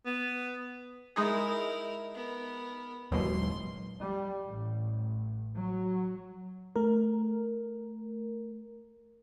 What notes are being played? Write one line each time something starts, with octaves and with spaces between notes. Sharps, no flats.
B3
G#3 D#4 E4 G#4 A#4
B3 A#4
D#1 D#2 B2 E3 F#3 G#3 C6
G3
A1
F#3
A3 A#4